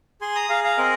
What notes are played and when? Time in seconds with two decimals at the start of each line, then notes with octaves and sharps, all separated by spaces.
0.21 G#4 G#5 C6
0.35 A#5 D#6
0.49 G#4 F5 A#5
0.64 F5 A#5
0.77 C4 A#4 D#5